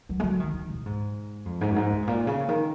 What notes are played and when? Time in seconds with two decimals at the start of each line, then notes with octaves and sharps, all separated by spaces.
0.09 F#3
0.20 G#3
0.23 F#3
0.40 D#3
0.54 D#3
0.70 B2
0.86 G#2
1.46 F2
1.61 G#2
1.71 F#2
1.76 G#2
1.92 A#2
2.03 G#2
2.07 A#2
2.27 C#3
2.48 D#3